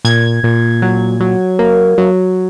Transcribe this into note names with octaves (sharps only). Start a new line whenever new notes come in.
A#2 G#6
A#2
F#3
F#3
A#3
F#3